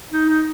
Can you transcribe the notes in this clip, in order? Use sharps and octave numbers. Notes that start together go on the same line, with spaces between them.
D#4
D#4